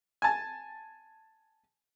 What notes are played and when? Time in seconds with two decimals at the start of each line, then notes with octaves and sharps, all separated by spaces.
0.22 G#5 A5